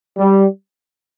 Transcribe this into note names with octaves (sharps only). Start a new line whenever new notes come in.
G3